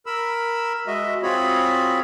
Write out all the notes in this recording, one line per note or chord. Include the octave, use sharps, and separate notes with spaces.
A#4 B5 E6
G#3 F#4 D#5 E5
C4 F4 F#4 G#4 C#5 B5